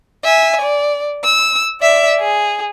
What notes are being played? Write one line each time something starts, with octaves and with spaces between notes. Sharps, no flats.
E5 G#5
D5
E6
D5 E5
G#4